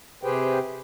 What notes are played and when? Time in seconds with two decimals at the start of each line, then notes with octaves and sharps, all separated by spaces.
0.23 C3 G4 G#4 B4 C5 G5